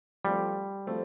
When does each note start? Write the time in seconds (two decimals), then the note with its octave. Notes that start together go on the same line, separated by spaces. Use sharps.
0.25 F3 G3 A3 C4
0.87 F3 A3 C4